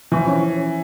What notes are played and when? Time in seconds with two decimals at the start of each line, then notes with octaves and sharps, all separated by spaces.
0.12 E3 F3
0.27 C#4